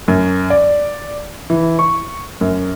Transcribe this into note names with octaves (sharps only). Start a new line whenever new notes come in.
F#2
D5
E3
C#6
F#2